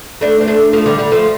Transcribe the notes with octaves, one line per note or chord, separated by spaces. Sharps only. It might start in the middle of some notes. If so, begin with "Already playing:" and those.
A3 D4
C4
A3 D4
F3 A3
D3 G3
D3 G3
F3 A3